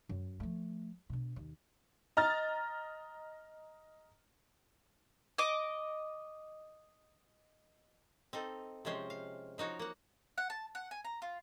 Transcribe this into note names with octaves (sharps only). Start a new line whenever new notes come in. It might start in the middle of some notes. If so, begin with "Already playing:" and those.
F#2
F3 A3
B2 D3
D#2
D#5 A#5 F6 A6
D#5 D6
C4 D#4 A4
C3 F3 G#3 C#4 C5
F5
F3 D#4 F#4 C#5
A#3 F#5
F#5
A5
F#5
G#5
A#5
F4